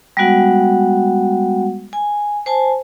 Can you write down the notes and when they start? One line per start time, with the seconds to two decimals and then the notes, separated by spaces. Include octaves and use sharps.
0.17 G3 G#3 B3 F#4 F#5
1.93 G#5
2.46 C5 G#5 A5